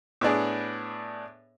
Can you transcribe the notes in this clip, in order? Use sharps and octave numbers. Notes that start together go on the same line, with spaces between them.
A2 B3 D4 G#4